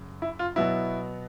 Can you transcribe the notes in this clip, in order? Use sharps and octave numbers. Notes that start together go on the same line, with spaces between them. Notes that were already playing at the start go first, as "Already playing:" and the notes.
Already playing: F#2 C#3
E4
F4
B2 F#3 B3 E4